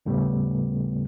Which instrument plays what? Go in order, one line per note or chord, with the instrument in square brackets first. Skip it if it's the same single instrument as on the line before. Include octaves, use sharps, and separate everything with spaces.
[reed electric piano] D#2 A2 C#3 G3 A3 B3